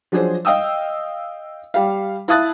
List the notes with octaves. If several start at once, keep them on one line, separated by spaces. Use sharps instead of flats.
F3 F#3 D4 G#4 C5
D#5 F5 G5 D#6 E6
G3 F5
E4 F5 A5 D#6 F#6 A6